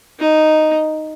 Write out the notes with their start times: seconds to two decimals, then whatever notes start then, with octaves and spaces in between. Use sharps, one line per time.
0.19 D#4